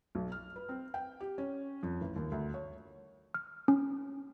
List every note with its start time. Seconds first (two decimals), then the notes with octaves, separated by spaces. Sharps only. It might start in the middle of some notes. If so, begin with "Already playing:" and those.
0.15 B1
0.32 F6
0.56 B4
0.69 C4
0.94 G5
1.20 G4
1.38 C#4
1.83 F2
2.01 A1
2.16 D#2
2.32 D2
2.54 C#5
3.34 F6
3.68 C#4